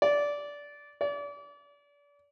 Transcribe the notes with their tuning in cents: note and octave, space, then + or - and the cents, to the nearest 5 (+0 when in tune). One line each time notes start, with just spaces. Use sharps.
D5 -15
D5 -35